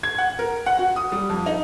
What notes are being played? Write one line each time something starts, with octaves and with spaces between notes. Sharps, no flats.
G#6
F#5
A#4
F#5
F#4
D#6
G3
F2
D#4